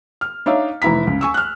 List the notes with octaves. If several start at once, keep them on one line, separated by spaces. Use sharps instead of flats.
F6
D4 D#4 C#5 E5 F5
F1 E3 E4 A#5 B6
C#2
G#5 C#6 E6
F6 F#6